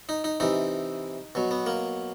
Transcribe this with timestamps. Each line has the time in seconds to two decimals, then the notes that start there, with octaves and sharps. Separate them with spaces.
0.09 D#4
0.24 D#4
0.40 C3 E3 D#4
1.35 B2 F#3
1.51 B3
1.66 A#3